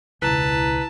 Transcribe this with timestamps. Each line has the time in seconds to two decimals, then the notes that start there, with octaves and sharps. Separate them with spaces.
0.22 E1 C#2 E4 B4 A5 A#5